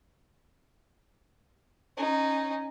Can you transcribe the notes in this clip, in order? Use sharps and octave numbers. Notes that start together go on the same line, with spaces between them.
C#4 D#4